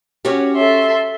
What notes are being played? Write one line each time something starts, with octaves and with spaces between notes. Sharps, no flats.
C#4 F#4 G4
A4 E5 C6